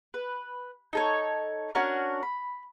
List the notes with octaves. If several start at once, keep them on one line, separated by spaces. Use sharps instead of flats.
B4
D#4 A4 C#5
C#4 D4 F#4 A#4
B5